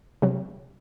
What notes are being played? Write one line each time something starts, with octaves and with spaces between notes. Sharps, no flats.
C3 F#3